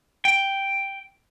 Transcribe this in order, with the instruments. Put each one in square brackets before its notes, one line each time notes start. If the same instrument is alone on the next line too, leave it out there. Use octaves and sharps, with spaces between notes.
[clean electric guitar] G5